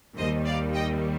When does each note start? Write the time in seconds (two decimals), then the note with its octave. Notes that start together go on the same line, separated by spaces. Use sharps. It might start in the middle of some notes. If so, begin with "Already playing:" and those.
0.17 D#2 D#3 G3 C5 D#5
0.45 D5 F5
0.74 D#5 G5